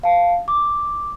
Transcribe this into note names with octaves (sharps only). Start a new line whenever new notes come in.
F5 A5
D6